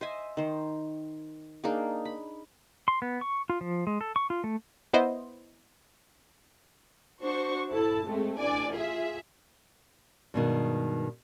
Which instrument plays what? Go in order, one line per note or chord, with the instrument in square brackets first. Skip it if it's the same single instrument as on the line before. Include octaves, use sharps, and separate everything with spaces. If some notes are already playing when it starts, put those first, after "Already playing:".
[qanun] C5 D#5 E5 G#5
D#3 C5
A#3 D4 D#4 G#4
B5
[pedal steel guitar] C6
B3
C#6
F4
F3
G#3
A4
C#6
F4
A3
[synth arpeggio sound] B3 E4 C5 D#5
[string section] D4 F#4 C5 C#6
E4 A4 A5
G#3 A3 C4
A1 D4 D5 G#5
F4 G#4 E5
[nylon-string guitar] G2 B2 D#3 G#3